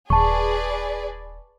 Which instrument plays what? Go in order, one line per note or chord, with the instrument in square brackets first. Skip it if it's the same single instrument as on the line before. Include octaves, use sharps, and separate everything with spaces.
[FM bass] D#1 [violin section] G#4 B4 D5 [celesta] A5 C#6